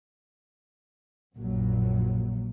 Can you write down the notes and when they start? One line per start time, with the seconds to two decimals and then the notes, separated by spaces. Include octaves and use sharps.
1.37 A#1 F#2 F#3